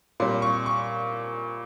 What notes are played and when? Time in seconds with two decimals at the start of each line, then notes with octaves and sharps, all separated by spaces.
0.20 A#2 G3 C6
0.42 C#6
0.66 C#6